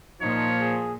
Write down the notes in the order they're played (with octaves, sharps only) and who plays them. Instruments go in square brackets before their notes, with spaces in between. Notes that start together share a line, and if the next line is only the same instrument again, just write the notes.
[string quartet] A#2 [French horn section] F3 [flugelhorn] D#4 [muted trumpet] C#5
[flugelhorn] G#4